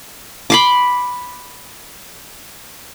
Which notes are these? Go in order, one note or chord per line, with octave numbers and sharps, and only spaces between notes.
B5 C6 D6